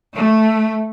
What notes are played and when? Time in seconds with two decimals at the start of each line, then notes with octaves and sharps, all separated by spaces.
0.13 A3